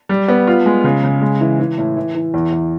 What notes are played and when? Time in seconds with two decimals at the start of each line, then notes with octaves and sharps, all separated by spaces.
0.09 G3
0.28 B3
0.47 F4
0.66 G#3
0.84 C#3
1.04 C#3
1.21 G#3
1.40 E3
1.60 E3
1.78 A2
1.97 E3
2.15 E3
2.34 E2
2.52 E2